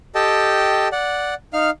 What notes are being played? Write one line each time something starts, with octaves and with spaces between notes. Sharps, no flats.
G4 A4 D#5 G5 A5
D5 F#5
D#4 F5 F6